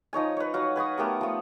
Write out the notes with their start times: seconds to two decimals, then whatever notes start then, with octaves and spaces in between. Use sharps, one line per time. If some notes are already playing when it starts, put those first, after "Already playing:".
0.13 F3 D#4 C#5 G#5
0.37 B4 C#5
0.54 F#3 F#4 F5
0.76 B4 G#5 C#6 D#6
0.98 A3 B3 G4 A#4
1.21 F3 A3